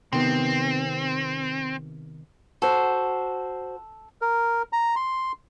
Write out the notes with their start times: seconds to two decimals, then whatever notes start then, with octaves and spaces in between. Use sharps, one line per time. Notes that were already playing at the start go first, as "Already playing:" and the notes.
0.13 C3 D#3 B3 C4
2.62 F#4 A4 C5
4.21 A#4
4.73 A#5
4.96 C6